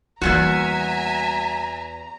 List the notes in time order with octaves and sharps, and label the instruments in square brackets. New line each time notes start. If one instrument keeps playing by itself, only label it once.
[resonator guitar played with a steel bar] E2 A#2 F#4 [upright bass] G3 A#3 [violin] E5 G#5 [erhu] A#5